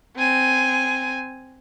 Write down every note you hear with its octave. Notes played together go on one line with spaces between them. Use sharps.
C4 G#5